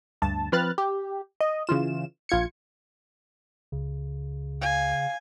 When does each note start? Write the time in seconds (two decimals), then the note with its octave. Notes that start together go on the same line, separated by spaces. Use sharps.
0.22 D2 G2 A5
0.52 F3 C4 B4 F6 F#6 A6
0.78 G4
1.41 D#5
1.67 C#3 E3 F4 E7
2.29 A#1 F4 G#6 C#7
3.72 C#2 C#3
4.61 F5 G#5